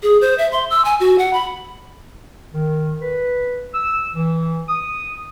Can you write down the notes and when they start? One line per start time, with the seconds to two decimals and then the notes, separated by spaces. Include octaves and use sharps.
0.03 G#4
0.21 C5
0.38 E5
0.52 C6
0.70 E6
0.85 G#5
1.00 F#4
1.18 F#5
1.33 B5
2.54 D#3
3.02 B4
3.74 E6
4.15 E3
4.69 D#6